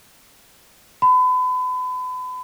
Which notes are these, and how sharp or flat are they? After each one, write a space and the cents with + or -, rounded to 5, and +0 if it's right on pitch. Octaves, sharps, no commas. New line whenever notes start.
B5 +35